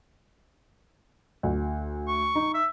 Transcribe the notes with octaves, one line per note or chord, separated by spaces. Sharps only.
D2
C#6
D#4
E5